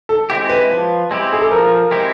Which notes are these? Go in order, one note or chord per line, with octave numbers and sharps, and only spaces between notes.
A4
G#3 C4 E4 G4
B4
F3
G#3 C4 E4 G4
G#4
A4
F3 A#4
G#3 C4 E4 G4